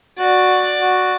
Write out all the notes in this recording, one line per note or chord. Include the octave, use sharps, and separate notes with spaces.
F#4 D5
F#4